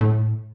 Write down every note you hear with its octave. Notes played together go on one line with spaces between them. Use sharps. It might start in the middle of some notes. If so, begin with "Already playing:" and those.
A2